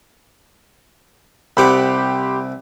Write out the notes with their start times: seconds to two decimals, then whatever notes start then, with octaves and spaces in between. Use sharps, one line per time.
1.57 C2 G4 C5 F#5 B5 D6